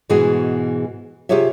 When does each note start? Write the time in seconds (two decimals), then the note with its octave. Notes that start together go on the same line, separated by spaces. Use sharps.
0.09 G#2 B2 E3 G#3 F#4 G#4
1.29 C3 F4 G4 G#4 C#5 E5